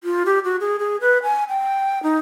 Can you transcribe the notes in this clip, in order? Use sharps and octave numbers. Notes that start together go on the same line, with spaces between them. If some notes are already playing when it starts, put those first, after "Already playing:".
F4
G4
F#4
G#4
G#4
B4
G#5
G5
D#4